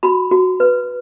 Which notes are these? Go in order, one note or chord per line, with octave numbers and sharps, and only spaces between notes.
F#4 B5
F#4
B4